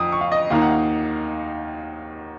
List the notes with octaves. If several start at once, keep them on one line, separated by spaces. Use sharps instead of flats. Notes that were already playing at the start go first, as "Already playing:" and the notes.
Already playing: F2 D#6
C#6
F5
D#5
D#2 D#3 A#3 D#4 F5
F#5
F5